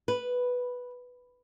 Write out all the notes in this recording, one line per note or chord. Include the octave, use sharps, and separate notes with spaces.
B4